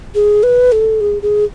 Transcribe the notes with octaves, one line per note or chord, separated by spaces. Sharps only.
G#4
B4
A4
G#4
G#4